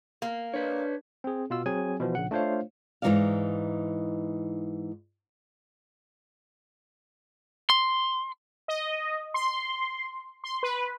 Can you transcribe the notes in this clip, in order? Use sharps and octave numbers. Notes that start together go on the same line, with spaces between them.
A#3
D4 B4 C#5
C4 G#4
B2 F4 E6
F#3 C4 G#4 G#5
B2 E3 F3
A#1 C#3 F#5
A3 D4 F4 C5 C#5 F5
G#2 E3 F3 D#4 D5 F5
C6
D#5
C6
C6
B4